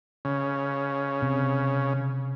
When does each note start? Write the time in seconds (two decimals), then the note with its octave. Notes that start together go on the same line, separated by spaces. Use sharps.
0.25 C#3
1.22 C3